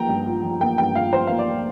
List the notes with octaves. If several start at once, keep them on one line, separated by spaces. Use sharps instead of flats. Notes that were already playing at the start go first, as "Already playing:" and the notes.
Already playing: F3 A#3 G5 A#5
G2
F4
F3
A#3 G5
G2 G5
F4 F5
F3 C5
A#3 F5
D5